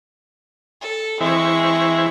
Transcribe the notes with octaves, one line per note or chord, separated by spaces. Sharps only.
A4
E3 G#3 C4 E4 C#6